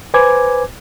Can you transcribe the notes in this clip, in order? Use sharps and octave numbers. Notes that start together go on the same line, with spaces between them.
B4 C5 G#5 D6 G#6